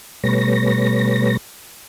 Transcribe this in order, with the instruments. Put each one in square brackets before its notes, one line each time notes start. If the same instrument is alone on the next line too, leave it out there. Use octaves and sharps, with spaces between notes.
[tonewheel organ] B2 G3 A3 B4 C#5 A#6